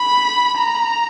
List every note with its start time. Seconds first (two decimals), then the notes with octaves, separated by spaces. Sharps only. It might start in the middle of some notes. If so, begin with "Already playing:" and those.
Already playing: B5
0.57 A#5